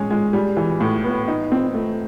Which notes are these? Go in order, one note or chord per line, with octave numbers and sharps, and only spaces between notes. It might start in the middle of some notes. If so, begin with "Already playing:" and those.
Already playing: G#3 C#4
G#3
G3
E3
A2
B3
D#4
C4
A3